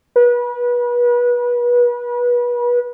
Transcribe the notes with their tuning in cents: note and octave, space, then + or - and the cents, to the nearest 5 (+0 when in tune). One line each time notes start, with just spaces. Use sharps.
B4 -30